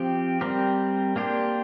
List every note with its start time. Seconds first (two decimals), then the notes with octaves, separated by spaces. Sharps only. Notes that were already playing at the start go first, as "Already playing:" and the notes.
Already playing: F3 C4 G4
0.41 G3 C4 G4 A#4
1.16 A#3 D4 G4 C5